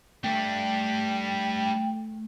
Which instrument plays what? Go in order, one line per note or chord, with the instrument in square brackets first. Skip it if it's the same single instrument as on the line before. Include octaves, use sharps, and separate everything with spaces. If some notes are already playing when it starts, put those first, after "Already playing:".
[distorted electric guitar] G3 D4 [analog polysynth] A3 [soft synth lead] G5